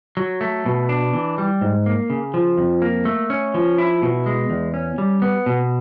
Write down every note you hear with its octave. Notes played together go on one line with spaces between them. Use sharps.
F#3
A3
B2
D4
E3
G3
G#2
A#3
C#3
F3
F2
A#3
A3
C#4
F3
E4
B2
G#3
E2
C#4
G3
B3
B2